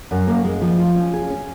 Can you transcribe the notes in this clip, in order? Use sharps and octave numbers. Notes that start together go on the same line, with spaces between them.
F#2
A#3
G#3
F3
F4
C#4
G#4
C#4